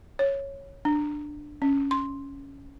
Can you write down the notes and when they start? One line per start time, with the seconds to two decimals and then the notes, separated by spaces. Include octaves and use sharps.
0.19 C#5
0.85 D4
1.62 C#4
1.91 C6